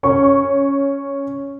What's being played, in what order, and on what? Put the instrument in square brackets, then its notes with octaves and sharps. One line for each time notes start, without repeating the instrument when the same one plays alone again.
[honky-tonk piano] C#4 C#6